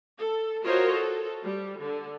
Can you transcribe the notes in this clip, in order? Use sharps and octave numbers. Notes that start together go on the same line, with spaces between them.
A4
F4 F#4 A#4 C5 C#5 D#5
A4
G3
D3